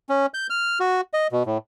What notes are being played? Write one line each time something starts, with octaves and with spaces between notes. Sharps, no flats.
C#4
G6
F6
F#4
D#5
B2
A2